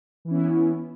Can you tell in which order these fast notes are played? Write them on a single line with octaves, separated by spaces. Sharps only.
E3 E4 C#4 B3